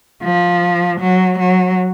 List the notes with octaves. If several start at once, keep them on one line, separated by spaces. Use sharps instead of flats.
F3
F#3
F#3